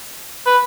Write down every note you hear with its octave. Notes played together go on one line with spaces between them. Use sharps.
B4